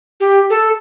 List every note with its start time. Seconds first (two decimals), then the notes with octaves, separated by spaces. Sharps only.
0.20 G4
0.50 A4